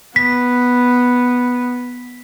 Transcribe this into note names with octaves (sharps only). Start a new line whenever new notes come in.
B3 B6